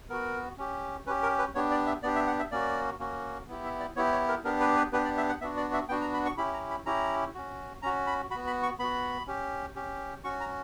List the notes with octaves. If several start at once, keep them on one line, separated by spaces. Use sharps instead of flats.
B3 F#4 A#4
C#4 G4
C#4 G4 B4
A#4
B4
B3 D4 G4 C#5
D5
E5
B3 D4 G4 D5
E5
F#5
E5
A#3 C#4 F#4 D5
A#3 C#4 F#4
B3 E4 G4
E5
D5
B3 E4 G4 C#5
C#5
A#4
B3 D4 G4 A#4
B4
B4
B3 D4 G4 B4
D5
E5
F#5
B3 D4 F#4 E5
D5
E5
B3 D4 F#4 G5
A#5
B5
C#6
C#4 E4 G4 B5
A#5
B5
C#4 E4 G4 A#5
C#4 F#4
C#4 F#4 A#5
B5
B3 F#4 B5
B5
C#6
B3 F#4 B5
C#4 G4
C#4 G4
C#4 F#4 C#6
A#5